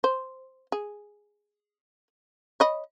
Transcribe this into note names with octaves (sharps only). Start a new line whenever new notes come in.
C5
G#4
C#5 D#5 B5